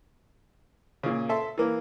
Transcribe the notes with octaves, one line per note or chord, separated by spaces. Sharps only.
A#2 C#3
A4 E5 C6
E3 A#3